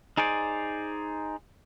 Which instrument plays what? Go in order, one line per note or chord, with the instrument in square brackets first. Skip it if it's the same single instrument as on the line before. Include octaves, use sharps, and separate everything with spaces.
[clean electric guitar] D#4 G#4 C5 D5